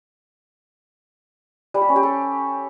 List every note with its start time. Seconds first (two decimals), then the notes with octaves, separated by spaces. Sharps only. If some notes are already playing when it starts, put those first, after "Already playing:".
1.74 G3
1.81 G4
1.89 C#4
1.96 G4
2.03 A4